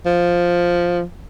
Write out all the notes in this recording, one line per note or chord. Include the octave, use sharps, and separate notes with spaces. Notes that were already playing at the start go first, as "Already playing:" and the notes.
F3